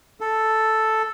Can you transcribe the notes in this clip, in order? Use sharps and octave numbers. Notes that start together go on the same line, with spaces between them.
A4